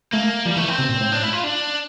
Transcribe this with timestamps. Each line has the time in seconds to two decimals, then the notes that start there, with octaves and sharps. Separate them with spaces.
0.13 A3 A#3
0.46 F3 G3
0.56 E3 A3
0.68 E3 C4
0.79 C3
0.89 A#2
1.01 A2
1.12 D4
1.22 E4
1.33 F4
1.44 D4